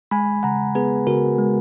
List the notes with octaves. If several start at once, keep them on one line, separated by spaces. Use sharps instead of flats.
G#3 G#5 B5
C#3 F#5 A#5
B3 G#4 B4
C#3 F#4 A#4
G#3